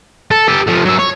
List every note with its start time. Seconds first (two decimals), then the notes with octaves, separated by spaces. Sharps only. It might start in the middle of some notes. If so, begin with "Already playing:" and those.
0.31 A4
0.48 G4 A4
0.67 F3 A3
0.85 F#3 E5
0.99 C#5